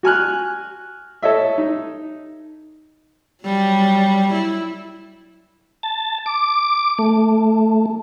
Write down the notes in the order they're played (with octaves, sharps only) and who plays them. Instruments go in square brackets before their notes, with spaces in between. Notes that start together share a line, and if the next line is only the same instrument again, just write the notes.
[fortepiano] F#4 G#5 F6 F#6
A4 C#5 D#5 E5
D#4
[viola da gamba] F#3 G3
E4
[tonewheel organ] A5
D6
A3